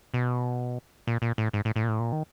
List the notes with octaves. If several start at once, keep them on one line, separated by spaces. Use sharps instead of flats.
B2
A#2
A#2
A2
G#2
A2
A2
A#2
A2
A#2
D#3